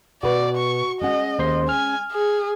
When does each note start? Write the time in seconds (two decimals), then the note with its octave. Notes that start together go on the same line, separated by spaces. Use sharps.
0.23 B2 F#4 B4 D5
0.57 C#6
1.02 G#3 C#4 D#5 F#5
1.39 D#2 C5 C6
1.69 G#5 F6
2.12 G#4